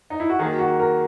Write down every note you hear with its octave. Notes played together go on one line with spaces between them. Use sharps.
D#4
E4
F#4
D#3 F#3 A#3 G#4
F#4
A#4